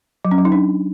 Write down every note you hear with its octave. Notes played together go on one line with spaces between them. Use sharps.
F#3
C#4
F#3
D#4
D4